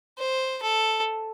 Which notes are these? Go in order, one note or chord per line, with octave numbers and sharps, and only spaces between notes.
C5
A4